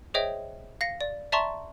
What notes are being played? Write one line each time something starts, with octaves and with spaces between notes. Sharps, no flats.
G#4 C5 C#5 D#5 E5 G5
F5 A#6 C#7
D5
D5 E5 A5 A#5 C6 C#6